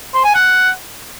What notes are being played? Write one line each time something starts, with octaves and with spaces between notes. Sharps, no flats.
C5
G#5
F#5